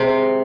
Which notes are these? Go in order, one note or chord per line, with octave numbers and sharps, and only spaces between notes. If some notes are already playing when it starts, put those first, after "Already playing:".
Already playing: C3 G#3 G#4